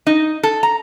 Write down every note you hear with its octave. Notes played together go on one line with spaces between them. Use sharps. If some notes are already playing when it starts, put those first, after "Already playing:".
D#4
A4
A#5